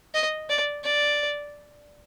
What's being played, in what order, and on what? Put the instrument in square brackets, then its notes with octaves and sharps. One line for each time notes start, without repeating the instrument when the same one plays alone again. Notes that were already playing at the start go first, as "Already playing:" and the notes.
[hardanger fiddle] D#5
D5
D5